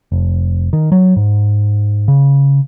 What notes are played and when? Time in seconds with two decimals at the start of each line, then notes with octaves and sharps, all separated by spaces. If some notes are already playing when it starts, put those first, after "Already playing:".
0.12 F1
0.73 D#3
0.92 F#3
1.16 G#2
2.08 C#3